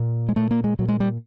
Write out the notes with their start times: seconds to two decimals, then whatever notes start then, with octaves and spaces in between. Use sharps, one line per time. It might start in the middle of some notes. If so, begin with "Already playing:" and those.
Already playing: A#2
0.29 G#3
0.36 A#2 A3
0.51 A#3
0.64 G#3
0.79 A#2 F#3
0.89 G#3
1.00 G3